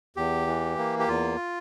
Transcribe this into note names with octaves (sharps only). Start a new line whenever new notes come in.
E2 G4
E3
A#3
G4
E2 F4